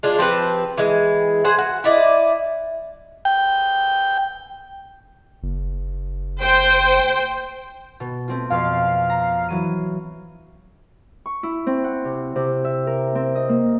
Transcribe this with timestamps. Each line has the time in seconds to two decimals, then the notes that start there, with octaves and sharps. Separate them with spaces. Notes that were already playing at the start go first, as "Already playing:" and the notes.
0.03 G#3 D4 F4
0.19 F3 C4 G4 B4
0.78 E3 G#3
1.44 G#4 C5 F#5
1.58 F#4
1.84 E4 D5 D#5
3.25 G5
5.43 F#1
6.39 C5 G5
8.00 B2
8.28 A3 C4 F4
8.50 F2 B2 F5 C6
9.09 A#5
9.48 E3 F#3 D#7
11.26 C#6
11.43 E4
11.67 C4
11.84 F#5
12.05 C3
12.36 C3
12.65 E5
12.87 A#4
13.15 C4
13.35 D#5
13.49 A#3